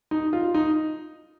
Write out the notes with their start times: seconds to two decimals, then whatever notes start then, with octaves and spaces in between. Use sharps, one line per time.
0.11 D#4
0.33 F4
0.54 D#4